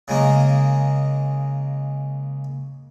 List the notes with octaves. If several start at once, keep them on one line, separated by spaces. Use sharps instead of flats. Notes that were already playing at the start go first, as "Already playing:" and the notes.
C#3 G#3 A#3